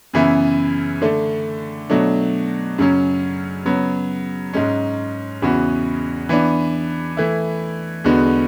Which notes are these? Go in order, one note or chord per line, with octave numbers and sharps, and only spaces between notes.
F#2 C#3 E3 B3 E4
D3 A3 D4
B2 F#3 A3 D4
F#2 C#3 F#3 C#4
C#3 F#3 B3
G#2 G#3 C#4
E2 C#3 E3 B3 F#4
E3 B3 D4
E3 A3 E4
E2 D3 G#3 B3 F#4